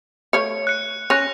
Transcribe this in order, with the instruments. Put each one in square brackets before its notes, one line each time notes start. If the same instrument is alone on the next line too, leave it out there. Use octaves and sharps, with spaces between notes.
[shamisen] A3 C#5 F5 [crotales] C#7
[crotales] F#6 C#7
[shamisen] C#4 [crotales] F#6 A#6 F7